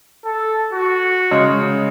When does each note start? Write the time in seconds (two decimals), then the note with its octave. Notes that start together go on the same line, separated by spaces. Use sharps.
0.25 A4
0.73 F#4
1.31 C#3 G#3